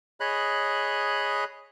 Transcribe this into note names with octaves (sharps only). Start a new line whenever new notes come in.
G#4 C#5 D#5 B5 F#6